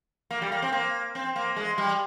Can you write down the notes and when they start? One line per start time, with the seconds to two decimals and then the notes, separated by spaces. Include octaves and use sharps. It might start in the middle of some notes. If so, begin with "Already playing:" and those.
0.31 A#3
0.42 G3
0.52 A#3
0.62 C4
0.73 A#3
1.15 C4
1.36 A#3
1.56 G#3
1.78 G3